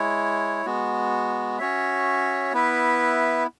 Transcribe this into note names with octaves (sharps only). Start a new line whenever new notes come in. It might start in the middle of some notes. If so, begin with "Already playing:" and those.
Already playing: G#3 E4 C#5
G#3 B3 F#4
C#4 F#4 C#5 E5
B3 E4 B4 E5